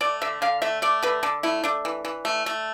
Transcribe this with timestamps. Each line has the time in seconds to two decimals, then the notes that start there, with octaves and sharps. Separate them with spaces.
0.01 A3 D5
0.22 D3 E5
0.42 D3 F5
0.62 A3 E5
0.82 A3 D5
1.03 D3 B4
1.23 D3 A4
1.43 A3 E4
1.64 A3 D4
1.85 E3
2.05 E3
2.25 A3
2.46 A3